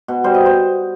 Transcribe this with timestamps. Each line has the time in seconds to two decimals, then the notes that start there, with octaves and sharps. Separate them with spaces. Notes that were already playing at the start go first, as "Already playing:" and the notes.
0.08 B2
0.24 G3 C5
0.34 D#5
0.46 C5